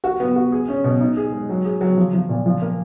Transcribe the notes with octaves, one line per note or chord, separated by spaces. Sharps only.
F#4
B3
F#4
G#4
C#4
B2
D#4
G#4
G#3
F#3
G#4
F#3
F3
F3
A#2
F3
A#3